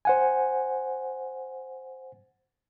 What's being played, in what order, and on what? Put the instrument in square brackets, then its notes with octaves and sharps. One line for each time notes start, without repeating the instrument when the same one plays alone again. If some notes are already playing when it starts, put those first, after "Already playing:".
[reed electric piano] C5 F#5 G#5